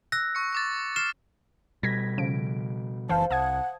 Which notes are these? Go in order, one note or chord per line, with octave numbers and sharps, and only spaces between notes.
E6 F#6 A#6
C#6 C#7
C#6 D6 A6
F6 C7 E7
B2 G3 G#6 A#6 B6
C#3 F3 D7
F#1 E3 C5 F5 A5
C2 F#5 A5 D#6 G#6